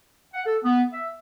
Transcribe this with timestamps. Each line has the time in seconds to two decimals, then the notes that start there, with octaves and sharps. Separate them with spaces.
0.34 F#5
0.46 A4
0.64 B3
0.92 E5